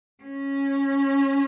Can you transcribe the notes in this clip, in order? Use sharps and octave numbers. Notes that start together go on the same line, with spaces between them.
C#4